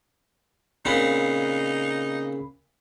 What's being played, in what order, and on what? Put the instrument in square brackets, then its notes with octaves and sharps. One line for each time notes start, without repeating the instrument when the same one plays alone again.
[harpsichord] A#2 C4 F#5 [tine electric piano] C#3 B5 C7 [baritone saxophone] D#4